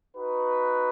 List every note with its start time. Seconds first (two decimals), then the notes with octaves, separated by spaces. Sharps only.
0.17 D#4 F#4 B4